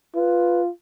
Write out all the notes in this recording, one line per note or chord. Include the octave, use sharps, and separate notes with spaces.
F4 B4